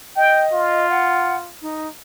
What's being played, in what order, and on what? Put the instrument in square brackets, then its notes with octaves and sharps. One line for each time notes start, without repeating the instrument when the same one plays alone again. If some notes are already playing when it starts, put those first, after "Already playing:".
[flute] D#5 [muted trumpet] G5
[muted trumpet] F4
[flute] F#5
D#4